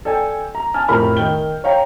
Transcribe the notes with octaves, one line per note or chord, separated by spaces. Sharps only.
A4 D5 G5 G#5
A#5
G#5 A5 F6
F2 A2 G4 A#4 B5 F6
D#3 G5 G7
C#5 F5 G5 A#5